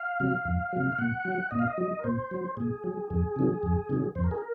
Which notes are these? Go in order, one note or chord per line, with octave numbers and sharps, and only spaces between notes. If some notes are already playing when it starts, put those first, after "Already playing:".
Already playing: F5
C3 F#3
F2
C3 F#3
F5
A#2 F#5
F#3
A#2 D#5
F5
D#5
F#3
A#4
A#2 C5
F#3
A#2 G#4
F#3
F2 G#4
C3 D#3 F#3
F2
C3 D#3 F#3
F2 C5
A#4
G#4
A#4